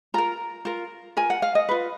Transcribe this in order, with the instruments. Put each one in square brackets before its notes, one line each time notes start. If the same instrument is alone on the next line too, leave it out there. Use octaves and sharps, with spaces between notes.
[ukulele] F4 A#4 A#5
F4 A#4
F4 A#4 G#5
F#5
F5
D#5
F4 B4